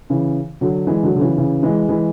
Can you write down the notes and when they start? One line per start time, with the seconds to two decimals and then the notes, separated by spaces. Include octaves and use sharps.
0.10 C#3 E3
0.61 D3 F#3
0.87 E3 G#3
1.03 D3 F#3
1.16 D3
1.21 C#3 E3
1.37 C#3 E3
1.63 E3 G#3
1.88 E3 G#3